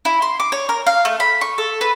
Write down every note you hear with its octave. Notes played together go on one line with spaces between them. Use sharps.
E4
C6
D6
C#5
A#4
F5
A3
B5
C#6
A4
B4